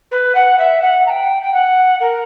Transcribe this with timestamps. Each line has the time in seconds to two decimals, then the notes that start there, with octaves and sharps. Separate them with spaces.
0.11 B4
0.34 F#5
0.58 E5
0.82 F#5
1.06 A#5
1.09 G5
1.42 G5
1.53 F#5
2.00 A#4